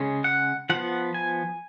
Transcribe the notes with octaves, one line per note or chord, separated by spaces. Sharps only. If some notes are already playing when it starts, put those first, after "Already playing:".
Already playing: C#3 G#3 C#4
F#5
F3 B3 F#5
G#5